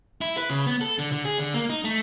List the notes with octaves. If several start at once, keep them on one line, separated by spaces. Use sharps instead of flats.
E4
B4
C#3
B3
A4
D3
D3
G#4
D3
A#3
D#4
A3